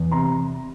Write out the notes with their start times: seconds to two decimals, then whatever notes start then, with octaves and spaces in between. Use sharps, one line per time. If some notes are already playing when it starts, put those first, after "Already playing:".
Already playing: E2
0.11 C3 A#5 C6